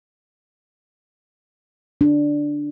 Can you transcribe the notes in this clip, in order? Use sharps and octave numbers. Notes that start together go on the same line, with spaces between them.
D4